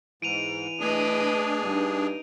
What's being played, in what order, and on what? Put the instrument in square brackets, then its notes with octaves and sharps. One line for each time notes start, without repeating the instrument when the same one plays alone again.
[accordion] G#2 [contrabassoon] E3 [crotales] D7 D#7 F7
[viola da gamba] A3 B4 D#5 [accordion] D4 G#4
[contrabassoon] G2 [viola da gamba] D#4